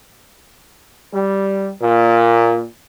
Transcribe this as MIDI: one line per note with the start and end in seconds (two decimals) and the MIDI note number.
1.14 1.72 55
1.82 2.66 46